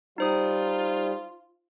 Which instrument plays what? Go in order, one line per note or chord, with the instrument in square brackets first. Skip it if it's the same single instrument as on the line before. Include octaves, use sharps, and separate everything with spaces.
[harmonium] G3 [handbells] D#4 C5 D#6 [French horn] F4